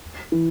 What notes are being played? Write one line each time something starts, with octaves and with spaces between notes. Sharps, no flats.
E3